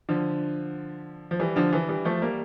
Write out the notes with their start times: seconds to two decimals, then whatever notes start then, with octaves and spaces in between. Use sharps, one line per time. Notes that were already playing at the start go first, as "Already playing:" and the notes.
0.09 D3 F3
1.31 F3
1.39 E3 G3
1.56 D3 F3
1.73 E3
1.88 E3 G3
2.05 F3 A3
2.22 G3 A#3